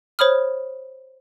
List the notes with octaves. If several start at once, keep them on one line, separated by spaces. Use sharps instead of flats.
C5 C#5 B5 D#6 F6